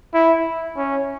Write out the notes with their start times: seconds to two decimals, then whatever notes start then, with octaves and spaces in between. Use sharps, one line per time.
0.14 E4
0.77 C#4